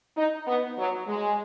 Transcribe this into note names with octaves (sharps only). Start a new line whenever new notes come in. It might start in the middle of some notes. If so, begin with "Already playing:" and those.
D#4
B3
F#3
G#3